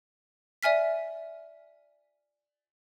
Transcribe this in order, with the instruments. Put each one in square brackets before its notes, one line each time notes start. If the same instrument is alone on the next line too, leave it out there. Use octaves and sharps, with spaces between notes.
[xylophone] D5 E5 G#5 F6 B6